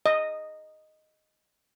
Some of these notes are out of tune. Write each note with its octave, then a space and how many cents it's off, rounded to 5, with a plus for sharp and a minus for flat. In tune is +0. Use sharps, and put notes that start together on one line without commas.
D#5 -5